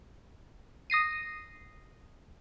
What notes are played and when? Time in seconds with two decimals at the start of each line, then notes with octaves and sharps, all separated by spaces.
0.90 D#6 A#6 C7 D#7